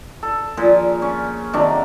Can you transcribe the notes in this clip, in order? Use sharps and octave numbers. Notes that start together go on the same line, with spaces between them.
A4
A#2 F3 G#4
C#4
C3 D#3 F#3 D4